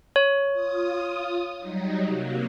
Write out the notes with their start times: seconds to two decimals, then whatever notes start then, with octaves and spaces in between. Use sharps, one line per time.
0.16 C#5
0.53 F4 D#6
1.59 F#3 G3 D#4
2.06 C3 F#3 A#3